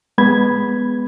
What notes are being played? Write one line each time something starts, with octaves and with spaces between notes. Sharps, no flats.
G#3 B3 B5 G#6